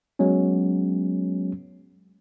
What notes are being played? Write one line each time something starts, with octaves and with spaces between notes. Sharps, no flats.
F#3 G#3 B3 C#4